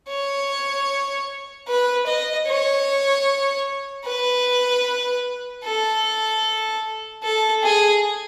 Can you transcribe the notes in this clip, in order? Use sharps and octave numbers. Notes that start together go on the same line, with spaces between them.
C#5
B4
D#5
C#5
B4
A4
A4
G#4